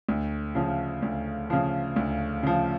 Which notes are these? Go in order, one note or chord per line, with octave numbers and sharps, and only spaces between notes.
D2
C#3 F3
D2
C#3 F3
D2
C#3 F3